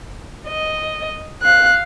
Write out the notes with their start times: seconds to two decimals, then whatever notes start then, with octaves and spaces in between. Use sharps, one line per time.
0.47 D#5
1.43 F5 F#6